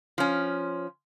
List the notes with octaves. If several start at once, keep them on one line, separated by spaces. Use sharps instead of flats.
F3 C#4